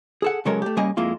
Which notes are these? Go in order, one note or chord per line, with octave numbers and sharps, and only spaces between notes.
G#4 A4 F#5
C#3 F#3 G#3 A4 A#4 C#5
A3 G4
C#3 G3 A#3 D#5 G#5
F2 G#3 A#3 E4 F4